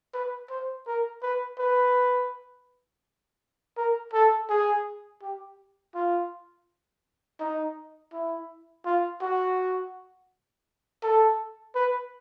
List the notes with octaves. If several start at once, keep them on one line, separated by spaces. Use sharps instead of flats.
B4
C5
A#4
B4
B4
A#4
A4
G#4
G4
F4
D#4
E4
F4
F#4
A4
B4